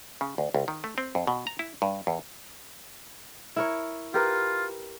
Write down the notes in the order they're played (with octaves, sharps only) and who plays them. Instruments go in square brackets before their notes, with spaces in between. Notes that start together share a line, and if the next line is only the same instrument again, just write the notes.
[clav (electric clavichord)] C#3
D2
C#2
D#3
A3
C4
F2
B2
A#5
E4
G2
E2
[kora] E4 A#4 C#5
[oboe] F4 [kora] G4 A#4 B4